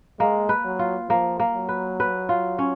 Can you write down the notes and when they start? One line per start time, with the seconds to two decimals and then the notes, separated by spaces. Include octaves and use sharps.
0.20 G#3 A#3
0.49 B4
0.64 F#3
0.79 F4
1.09 F3 A#3
1.40 A#3
1.55 F#3
1.69 B4
2.00 B4
2.29 F4
2.59 C#4